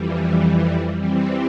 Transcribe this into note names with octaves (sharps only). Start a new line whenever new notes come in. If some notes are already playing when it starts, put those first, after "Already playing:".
Already playing: F2 E3 G3
E3 G3 C4